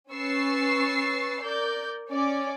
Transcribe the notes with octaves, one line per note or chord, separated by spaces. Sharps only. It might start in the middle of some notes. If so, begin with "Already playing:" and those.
C#4 B4 C#6 E6 A6 C7
A#4 D5 G6
C#4 D5